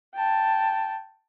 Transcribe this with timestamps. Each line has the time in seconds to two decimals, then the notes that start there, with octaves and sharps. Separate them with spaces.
0.14 G5 A5